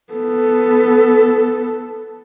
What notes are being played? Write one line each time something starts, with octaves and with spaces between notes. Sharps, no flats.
B3 A4